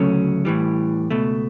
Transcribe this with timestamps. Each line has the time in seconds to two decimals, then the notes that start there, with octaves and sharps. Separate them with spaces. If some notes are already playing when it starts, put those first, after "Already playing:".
Already playing: D2 C#3 F#3 A3 C#4
0.45 A2 E3 G3
1.11 C#2 B2 A3